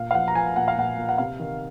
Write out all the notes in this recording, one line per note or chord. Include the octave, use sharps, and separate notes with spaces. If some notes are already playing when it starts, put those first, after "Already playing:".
Already playing: A#2 F5
F5
F3 F#5
A#5
F3 G#5
A#2 F#5
F5
A#2 F#5
A#2
F#5
C3 F5
D#3